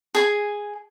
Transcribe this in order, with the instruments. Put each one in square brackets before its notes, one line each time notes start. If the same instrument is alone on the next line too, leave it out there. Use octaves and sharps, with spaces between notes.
[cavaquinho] G#4 G#5